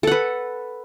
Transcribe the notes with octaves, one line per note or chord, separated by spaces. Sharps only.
A4 B4 F#5